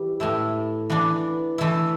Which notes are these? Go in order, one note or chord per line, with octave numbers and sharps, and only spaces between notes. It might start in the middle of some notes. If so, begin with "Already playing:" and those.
Already playing: E3 G3
A2 A3 E4
E3 B3 D4
E3 A3 E4